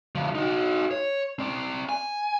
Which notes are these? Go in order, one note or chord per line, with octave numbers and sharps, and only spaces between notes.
D3 F3
D#4 F#4
C#5
C4 D5
G#5